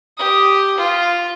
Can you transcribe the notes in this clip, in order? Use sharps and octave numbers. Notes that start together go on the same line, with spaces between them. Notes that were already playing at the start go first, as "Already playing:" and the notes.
G4 D#6
F4